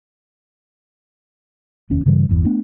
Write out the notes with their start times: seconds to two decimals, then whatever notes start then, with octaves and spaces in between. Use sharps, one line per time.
1.90 F1 D#2 C#4
2.06 G2 C#3 E3 G3
2.29 G1 E2
2.45 A3 B3 D4